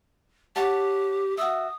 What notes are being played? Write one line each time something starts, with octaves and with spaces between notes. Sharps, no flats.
G4 C#5 F#5 A5
F#4 E5 D#6